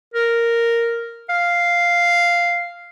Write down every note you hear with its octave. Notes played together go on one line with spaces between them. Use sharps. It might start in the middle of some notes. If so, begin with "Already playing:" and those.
A#4
F5